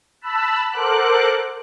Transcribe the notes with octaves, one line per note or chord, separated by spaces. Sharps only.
A5 B5 E6 F#6
A4 A#4 C5 F#5 D6 F#6